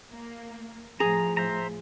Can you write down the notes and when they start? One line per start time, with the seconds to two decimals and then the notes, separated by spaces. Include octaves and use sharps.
0.11 A#3
1.00 A2 F3 G#4 A#5
1.37 C5 E5 A#5